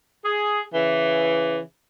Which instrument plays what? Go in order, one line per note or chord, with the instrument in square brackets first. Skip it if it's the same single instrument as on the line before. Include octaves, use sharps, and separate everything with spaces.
[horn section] G#4
C#3 E3